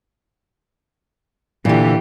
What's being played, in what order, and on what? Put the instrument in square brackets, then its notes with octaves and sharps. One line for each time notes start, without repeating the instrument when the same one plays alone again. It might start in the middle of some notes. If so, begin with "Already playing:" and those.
[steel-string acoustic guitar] A#2 D3 [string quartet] E3 G4